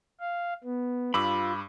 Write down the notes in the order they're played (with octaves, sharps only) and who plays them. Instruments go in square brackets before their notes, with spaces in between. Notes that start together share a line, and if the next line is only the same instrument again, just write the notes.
[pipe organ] F5
B3
[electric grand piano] G2 D6 E6 [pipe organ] F4 [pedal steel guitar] B5